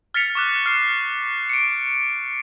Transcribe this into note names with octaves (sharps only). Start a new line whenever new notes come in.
F6 A6 B6 C#7 F7
C#6 D6 F#6
F6 C7 C#7
C#7 D7